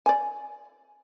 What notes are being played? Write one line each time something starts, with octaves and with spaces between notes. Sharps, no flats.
D5 G#5